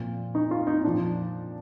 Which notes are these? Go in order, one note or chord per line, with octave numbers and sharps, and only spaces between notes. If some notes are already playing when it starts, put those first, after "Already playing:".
Already playing: A#2 F3
D#4
F4
D#4
A#2 F3 D4